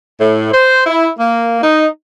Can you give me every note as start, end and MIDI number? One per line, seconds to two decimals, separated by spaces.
0.20 0.50 45
0.51 0.82 72
0.86 1.08 64
1.18 1.59 58
1.62 1.86 63